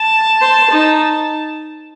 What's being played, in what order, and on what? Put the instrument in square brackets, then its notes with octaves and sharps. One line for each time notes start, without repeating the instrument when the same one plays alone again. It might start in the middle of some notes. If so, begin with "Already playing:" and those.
Already playing: [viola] A5
[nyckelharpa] C5
D#4